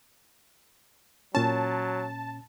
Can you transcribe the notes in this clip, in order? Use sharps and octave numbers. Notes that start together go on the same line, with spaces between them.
A#2 F#3 C#4 A5